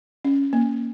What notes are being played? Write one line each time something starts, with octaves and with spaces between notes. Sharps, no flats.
C#4
A#3